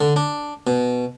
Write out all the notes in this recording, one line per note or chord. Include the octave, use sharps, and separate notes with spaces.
D3
D4
B2